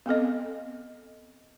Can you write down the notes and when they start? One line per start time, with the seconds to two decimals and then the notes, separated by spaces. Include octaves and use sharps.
0.06 B3 C4 A4 D#5